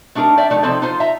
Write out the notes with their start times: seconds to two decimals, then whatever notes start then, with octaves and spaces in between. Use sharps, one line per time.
0.15 A3 D4 D#4 G4 A#4
0.38 D5 E5 G5
0.50 F3 A3 D#4
0.63 C3 F3 C4 D#4 A4
0.82 D#4 F4 C5
1.00 D#5 E5 A#5